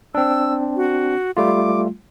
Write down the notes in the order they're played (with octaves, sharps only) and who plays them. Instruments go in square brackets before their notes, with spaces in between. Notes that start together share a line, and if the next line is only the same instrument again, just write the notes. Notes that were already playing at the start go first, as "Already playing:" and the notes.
[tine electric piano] C4 D4 [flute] E6
[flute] F#4
[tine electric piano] G3 A3 F4 [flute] D6